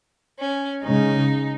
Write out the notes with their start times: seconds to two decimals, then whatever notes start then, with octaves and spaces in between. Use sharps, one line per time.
0.38 C#4
0.84 C#3 G#3 C#4 D#4